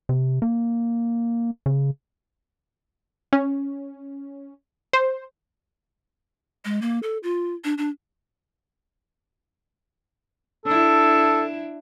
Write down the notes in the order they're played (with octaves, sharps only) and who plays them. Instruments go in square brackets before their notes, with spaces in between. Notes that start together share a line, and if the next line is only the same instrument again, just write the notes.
[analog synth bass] C3
A#3
C#3
[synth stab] C#4
C5
[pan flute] G#3
A#3
A4
F4
D4
D4
[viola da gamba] D4 E4 [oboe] A4